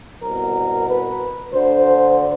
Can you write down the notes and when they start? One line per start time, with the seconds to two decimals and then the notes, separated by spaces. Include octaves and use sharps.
0.22 C2 B2 A#4
0.88 B4
1.53 D2 D3 C5